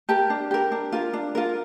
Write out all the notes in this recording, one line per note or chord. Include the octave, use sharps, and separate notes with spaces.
G4 A#4 A5
D4
G4 A#4
D4
F4 A#4
D4
F4 A#4